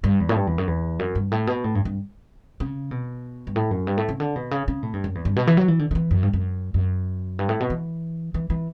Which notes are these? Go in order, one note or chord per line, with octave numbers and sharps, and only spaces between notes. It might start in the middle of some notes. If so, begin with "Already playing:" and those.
G2
E2
A2
G2
E2
F#2
E2
F#2
G2
A2
B2
A2
G2
G2
C#3
B2
G2
A2
F#2
G2
A2
C#3
D3
B2
C#3
C#3
A2
G2
F#2
E2
G2
B2
E3
F#3
E3
D3
D3
E3
F#2
G2
F#2
F#2
G2
A2
B2
E3
E3
E3